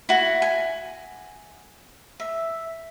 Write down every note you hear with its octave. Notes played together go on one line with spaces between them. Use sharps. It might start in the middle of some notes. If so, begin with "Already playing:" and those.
E4 F#4
G#5
E5